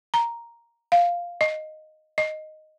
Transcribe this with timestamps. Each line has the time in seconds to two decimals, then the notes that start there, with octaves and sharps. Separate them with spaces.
0.14 A#5
0.92 F5
1.41 D#5
2.18 D#5